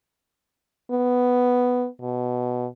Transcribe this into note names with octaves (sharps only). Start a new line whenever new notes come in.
B3
B2